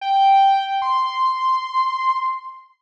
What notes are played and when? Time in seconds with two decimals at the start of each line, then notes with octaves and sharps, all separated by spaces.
0.01 G5
0.82 C6